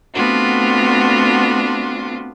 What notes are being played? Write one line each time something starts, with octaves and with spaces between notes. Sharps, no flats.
A3 B3 C4 D4 F4 F#4